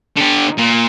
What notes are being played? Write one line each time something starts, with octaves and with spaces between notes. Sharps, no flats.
D3 G4
A#2